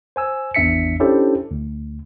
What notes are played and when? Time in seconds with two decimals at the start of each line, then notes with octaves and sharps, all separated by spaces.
0.16 C5 G#5 E6
0.54 G#1 E2 D4 E5 B6 C#7
1.00 C#4 D4 E4 G4 A4 C5
1.51 D2